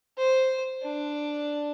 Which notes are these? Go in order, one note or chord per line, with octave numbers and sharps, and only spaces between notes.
C5
D4